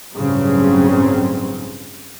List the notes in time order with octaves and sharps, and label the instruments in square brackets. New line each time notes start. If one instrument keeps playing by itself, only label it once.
[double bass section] A1 G2 C#3 F#3 C4